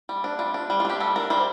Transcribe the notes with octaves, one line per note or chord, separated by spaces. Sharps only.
G3
D4
G3 F4
D4
G3
F4
D4 G4
G3 A4
D4 A#4
G3 C5